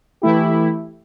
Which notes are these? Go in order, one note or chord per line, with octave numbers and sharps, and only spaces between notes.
E3 A3 E4 G4